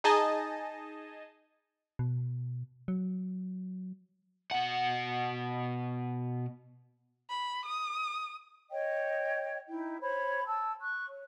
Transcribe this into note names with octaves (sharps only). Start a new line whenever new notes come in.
D#4 G#4 D#5 G#5 A5
B2
F#3
B2 F#5
B5
D#6
C#5 D#5 G5
D#4 E4 G5
C5 C#5 B5
G5 A5 E6
C#6 F#6
C#5